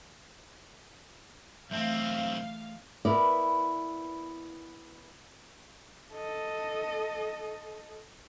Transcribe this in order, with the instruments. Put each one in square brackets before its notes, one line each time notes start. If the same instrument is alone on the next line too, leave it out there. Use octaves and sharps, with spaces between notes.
[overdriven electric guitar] B1 C4 [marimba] E3 A3 [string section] F5
[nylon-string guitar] B3 E4 A#4 B4 D5
[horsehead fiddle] A4 D#5